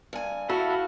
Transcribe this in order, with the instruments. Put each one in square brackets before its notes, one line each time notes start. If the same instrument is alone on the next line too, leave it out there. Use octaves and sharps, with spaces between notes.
[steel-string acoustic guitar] G2 G#5
[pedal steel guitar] E4 A4 [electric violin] F#4 [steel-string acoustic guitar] F5